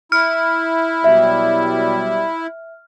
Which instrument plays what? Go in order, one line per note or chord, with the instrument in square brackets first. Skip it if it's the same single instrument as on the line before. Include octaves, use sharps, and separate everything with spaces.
[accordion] E4 [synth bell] F6
[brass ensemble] B2 F#3 G3 [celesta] E5